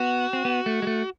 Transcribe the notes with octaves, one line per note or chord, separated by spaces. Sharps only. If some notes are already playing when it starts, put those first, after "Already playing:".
Already playing: B3 F#4
C4
B3
A3
G#3
A3